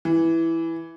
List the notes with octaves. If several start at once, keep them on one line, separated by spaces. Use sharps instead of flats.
E3